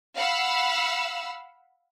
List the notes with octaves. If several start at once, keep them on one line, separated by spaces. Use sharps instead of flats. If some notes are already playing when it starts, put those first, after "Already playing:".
F5 F#5 B5 E6